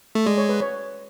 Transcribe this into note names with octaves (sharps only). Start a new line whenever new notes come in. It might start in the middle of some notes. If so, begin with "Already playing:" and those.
A3
G#3 D5
C#5
B4
C#5